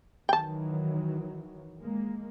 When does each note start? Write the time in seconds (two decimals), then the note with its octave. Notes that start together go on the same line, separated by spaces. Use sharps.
0.29 D#3 E3 F#3 G5 A5
1.80 G#3 A#3